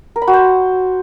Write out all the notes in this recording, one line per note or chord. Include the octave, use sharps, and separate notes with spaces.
A#4
B5
F#4
C5